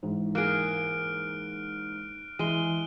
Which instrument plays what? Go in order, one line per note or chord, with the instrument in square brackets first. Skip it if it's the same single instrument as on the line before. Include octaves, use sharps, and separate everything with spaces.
[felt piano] G#2 E3
[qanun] A#3 G#4 [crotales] F6 F#6 D7
[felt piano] E3 [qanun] G#3 [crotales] D#7 G7